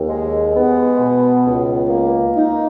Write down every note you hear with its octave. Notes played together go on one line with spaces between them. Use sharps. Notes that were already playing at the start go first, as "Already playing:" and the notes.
Already playing: D#2
G#3
B3
B2
C#2
A#3
D#4